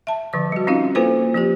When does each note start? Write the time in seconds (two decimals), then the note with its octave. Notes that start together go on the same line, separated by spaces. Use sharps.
0.07 E5 A5
0.33 D3 F3 D6
0.52 G3 F#4
0.67 C4 C#4 D#4 F4 F5
0.95 A#3 E4 F4 A4 B4 C5
1.34 F3 F4 G4